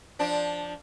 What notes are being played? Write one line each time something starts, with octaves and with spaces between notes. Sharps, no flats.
F3 D4